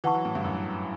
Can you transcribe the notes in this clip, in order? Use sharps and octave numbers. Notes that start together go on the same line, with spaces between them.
E3 B4 F#5 A5 C#6
F#3
A2
G2
F#2